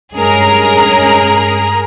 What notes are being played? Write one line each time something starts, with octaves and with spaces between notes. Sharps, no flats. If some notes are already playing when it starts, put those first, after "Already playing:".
G2 G#3 C#4 G#4 A#4 A#5